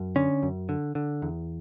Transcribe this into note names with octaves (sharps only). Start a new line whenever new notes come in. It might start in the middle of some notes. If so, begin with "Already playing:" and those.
Already playing: F#2
D3 C#4
F#2
D3
D3
E2